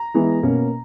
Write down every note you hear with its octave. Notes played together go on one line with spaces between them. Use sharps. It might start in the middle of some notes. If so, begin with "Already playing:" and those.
Already playing: A#5
E3 G#3 B3
B2 A#3 C#4